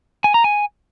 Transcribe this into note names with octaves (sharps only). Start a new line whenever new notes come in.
G#5
A#5
G#5